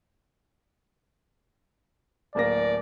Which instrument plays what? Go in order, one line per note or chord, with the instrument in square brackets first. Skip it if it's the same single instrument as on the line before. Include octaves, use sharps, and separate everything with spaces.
[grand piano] D1 A#3 A#6 [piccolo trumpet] D5